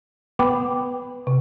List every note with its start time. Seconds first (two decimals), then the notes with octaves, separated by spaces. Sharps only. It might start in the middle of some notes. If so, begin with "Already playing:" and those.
0.39 B3 G5 D6
1.27 C3